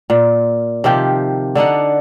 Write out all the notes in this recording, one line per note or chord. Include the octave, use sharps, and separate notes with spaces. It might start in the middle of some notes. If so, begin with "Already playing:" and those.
A#2
C3 D#3 F3 G4
D3 D4 D#4 F#5